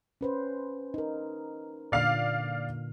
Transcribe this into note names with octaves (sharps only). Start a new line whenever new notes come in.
C#4 B4 C5
D#4 A#4
A#2 D3 D5 F5 F6